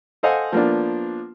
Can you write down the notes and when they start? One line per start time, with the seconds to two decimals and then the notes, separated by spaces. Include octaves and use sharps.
0.23 A4 C5 D#5 F5 F#5 G#5
0.52 F3 A#3 B3 D4